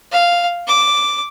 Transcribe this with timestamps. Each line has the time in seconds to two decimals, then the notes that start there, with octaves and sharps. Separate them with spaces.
0.12 F5
0.67 D6